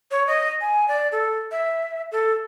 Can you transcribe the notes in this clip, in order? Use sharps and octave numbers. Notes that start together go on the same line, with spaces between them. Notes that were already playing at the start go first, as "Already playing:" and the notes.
C#5
D#5
G#5
D5
A4
E5
A4